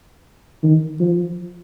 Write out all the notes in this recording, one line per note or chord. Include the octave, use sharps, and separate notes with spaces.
D#3
F3